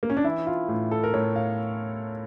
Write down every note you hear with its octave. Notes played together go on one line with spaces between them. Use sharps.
A#3
C#4
D4
E3 E4
F4
A2
A4
A#4
A2 C#5
F5